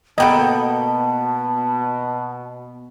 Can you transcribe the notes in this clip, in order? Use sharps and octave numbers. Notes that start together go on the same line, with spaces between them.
B2 A#3 B3 A4 D#5 G5 A5